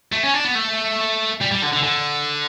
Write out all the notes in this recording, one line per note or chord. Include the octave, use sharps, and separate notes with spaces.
A3
C#4
D4
B3
A3
G3
G3
D3
D3
D3